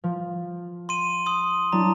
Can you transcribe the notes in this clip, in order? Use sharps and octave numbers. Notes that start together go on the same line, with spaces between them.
F3
C6 D#7
C6 D#6
F#3 D4 E4 A#5